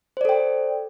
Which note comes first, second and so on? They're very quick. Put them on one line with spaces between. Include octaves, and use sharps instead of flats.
C5 D5 A4 G5